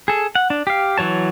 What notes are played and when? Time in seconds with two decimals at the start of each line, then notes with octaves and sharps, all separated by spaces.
0.08 G#4 A4
0.35 F#5
0.50 D4
0.67 G4 F5
0.98 E3 F#3 C#5 A5